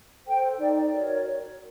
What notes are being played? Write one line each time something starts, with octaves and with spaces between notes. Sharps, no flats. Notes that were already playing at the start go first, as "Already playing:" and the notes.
A4 C5 G5
D#4 D5
F#4 A#4 C#5 D5